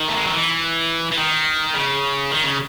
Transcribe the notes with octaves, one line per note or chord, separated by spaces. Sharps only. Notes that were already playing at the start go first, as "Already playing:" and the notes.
Already playing: D#3
A3
G#3
F#3
E3
E3
D#3
C#3
D#3
C#3